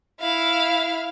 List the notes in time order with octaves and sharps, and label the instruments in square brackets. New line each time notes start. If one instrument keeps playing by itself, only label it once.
[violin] E4 F5